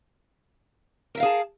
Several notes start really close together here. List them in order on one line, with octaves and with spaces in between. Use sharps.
A#4 E5 F5 G#4 A5